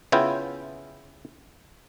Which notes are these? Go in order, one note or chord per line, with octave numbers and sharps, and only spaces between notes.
C#3 B3 E4 F4 G5